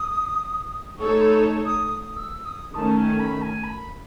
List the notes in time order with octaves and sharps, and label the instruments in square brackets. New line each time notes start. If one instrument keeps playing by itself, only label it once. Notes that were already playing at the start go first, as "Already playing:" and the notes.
Already playing: [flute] D#6
[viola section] A3 D#4 A4 C#5 [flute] C#6
[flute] B5
D#6
D#6
E6
D#6
[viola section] D#3 A3 C#4 [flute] A5
[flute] G#5
B5
G#5
B5